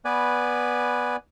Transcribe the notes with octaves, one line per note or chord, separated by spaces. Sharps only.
B3 B4 D5 G#5